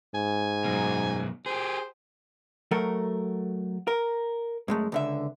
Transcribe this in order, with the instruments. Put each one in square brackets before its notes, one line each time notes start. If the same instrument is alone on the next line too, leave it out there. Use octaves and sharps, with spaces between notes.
[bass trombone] G#2 [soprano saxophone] G#5
[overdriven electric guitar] F#2 B2
[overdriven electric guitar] G4 G#4 [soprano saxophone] C5
[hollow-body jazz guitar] F#3 A3 A4 A#4
A#4
F#2 G#3 A3
C#2 D3 E5